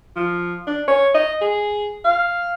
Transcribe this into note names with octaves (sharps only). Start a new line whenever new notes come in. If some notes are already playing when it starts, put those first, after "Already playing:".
F3
D4
C#5
D#5
G#4
F5